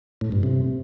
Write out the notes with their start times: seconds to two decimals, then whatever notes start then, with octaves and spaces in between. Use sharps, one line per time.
0.21 A2
0.32 G2
0.43 C3